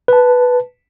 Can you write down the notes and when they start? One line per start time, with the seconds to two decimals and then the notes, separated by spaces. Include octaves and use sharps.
0.08 B4 A5